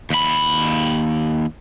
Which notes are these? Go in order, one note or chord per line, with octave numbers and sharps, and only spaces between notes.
D#2 B5